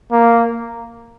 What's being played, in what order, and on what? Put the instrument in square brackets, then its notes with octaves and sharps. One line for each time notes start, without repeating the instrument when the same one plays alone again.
[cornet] A#3